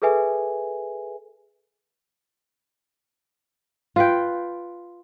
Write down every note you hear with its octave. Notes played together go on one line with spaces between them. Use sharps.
G#4 A4 B4 E5 G#5
F4 B4 G5